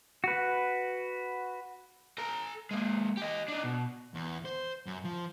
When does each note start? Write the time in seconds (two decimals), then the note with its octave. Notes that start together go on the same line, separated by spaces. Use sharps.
0.24 F#4 B4
2.18 A4 A#5
2.71 G#3 A#3
3.17 G4 D#5
3.48 D4 D#4
3.64 B2
4.14 E2
4.45 C5
4.86 F#2
5.05 F3